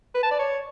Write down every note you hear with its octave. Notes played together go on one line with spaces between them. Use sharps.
B4
A5
D5
C#5